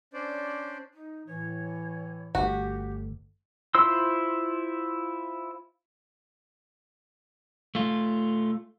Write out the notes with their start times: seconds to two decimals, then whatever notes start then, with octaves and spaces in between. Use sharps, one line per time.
0.13 C#4 D4 C5 D5
0.93 D#4
1.27 A2 E3 C#5
2.35 G1 A3 F#4 G4
3.75 E4 F4 C5 C6 E6
7.75 A3 F4